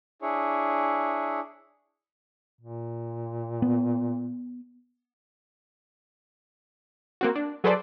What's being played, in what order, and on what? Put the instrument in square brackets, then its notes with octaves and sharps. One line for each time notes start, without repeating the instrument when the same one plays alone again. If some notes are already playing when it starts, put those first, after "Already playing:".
[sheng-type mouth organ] D4 E4 G#4 C#5
[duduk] A#2
[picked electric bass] B3
[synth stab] A#3 C4 F#4
D4
F#3 G#4 A4 B4 C5 D5